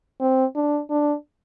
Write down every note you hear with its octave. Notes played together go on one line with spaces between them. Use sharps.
C4
D4
D4